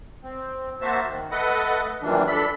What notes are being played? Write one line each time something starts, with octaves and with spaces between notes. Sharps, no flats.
C4
A#3 F#4 C5 E5 A5
D#3
A3 A4 B4 D#5 F#5
F#2 A#2 D#3 E3 G3 D4
D4 A4 B5